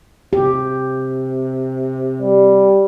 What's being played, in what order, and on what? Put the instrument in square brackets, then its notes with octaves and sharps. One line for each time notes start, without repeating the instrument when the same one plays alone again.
[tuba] C3 [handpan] G4
[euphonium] G3